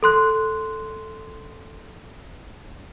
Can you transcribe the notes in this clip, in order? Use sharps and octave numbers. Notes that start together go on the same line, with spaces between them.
A4 C6 F#6